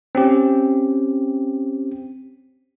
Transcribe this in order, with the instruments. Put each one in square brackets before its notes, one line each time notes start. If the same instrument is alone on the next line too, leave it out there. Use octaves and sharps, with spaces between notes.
[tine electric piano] C4 C#4 G4